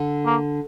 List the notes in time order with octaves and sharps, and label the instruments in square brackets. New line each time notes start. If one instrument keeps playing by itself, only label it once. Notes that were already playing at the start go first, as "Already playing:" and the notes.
Already playing: [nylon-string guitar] D3
[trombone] A#3